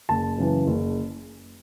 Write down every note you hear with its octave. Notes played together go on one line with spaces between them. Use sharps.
F#1 A5
F#2 C#3 E3
F#1